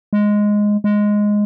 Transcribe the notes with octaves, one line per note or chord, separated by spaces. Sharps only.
G#3
G#3